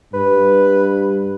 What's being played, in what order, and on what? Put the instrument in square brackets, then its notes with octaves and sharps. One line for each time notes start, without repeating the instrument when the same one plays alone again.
[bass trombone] G2 [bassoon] B4